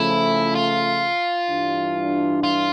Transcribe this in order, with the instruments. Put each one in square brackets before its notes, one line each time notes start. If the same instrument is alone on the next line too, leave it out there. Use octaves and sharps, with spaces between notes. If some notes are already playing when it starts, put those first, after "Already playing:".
Already playing: [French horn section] C#3 F3 A3 [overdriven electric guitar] E4
[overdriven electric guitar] F4
[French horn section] G2 E3 G3 D4
[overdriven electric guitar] F4